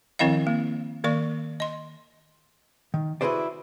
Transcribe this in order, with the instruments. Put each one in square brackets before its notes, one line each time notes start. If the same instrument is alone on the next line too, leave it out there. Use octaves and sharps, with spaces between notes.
[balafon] D#3 F3 C4 E4 D#5 F5
A#3
D#3 A#3 D5 C#6
D#5 C6
[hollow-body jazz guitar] D#3
E4 F#4 G#4 B4 C5 D5